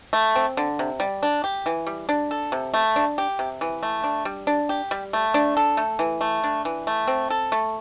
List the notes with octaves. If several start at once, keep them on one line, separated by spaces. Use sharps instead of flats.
A3
C4
D3
C3
G3
D4
G4
E3
G3
D4
A4
C3
A3
D4
G4
C3
E3
A3
D4
G3
D4
G4
G3
A3
D4
A4
A3
E3
A3
D4
E3
A3
C4
A4
A3